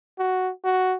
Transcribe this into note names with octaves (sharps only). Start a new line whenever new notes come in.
F#4
F#4